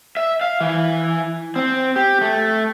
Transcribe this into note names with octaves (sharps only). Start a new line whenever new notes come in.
E5
F5
E3
C4
G4
A3